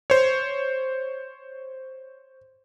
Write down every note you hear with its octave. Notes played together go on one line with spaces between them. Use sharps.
C5 C#5